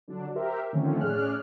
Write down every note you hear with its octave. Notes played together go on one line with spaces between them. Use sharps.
D3 F#3 D4
G4 A#4 C5 E5
D3 D#3 F3 A3 C4 C#4
A2 C#4 G#4 D5 F6 F#6